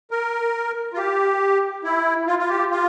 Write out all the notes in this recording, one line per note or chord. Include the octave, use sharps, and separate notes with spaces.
A#4
F4
G4
E4
F4
F4
G4
F4